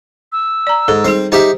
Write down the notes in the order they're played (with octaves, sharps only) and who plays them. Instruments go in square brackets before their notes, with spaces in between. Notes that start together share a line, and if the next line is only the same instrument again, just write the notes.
[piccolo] E6
[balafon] D5 A#5
[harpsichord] G#2 [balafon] A4
[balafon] G3 D#4 G#4 [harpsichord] C4
[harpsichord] D#4 G4 E5 [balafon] G#4 C5